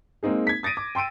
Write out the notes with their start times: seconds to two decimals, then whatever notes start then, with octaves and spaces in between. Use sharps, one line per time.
0.23 G#3 A#3 C4 D#4 G#4
0.47 G#6 B6
0.63 D#6 A6 A#6 D7 D#7
0.77 D6
0.95 G5 C6 E6 D7 D#7